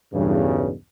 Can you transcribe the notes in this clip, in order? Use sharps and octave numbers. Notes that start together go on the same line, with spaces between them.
B1 E2 G2 C#3